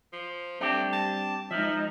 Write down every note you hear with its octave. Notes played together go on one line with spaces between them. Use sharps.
F3
G3 A3 C4 D4 G4
A5
F3 G#3 D#4 E5